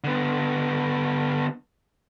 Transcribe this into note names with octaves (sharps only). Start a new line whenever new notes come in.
D3 B3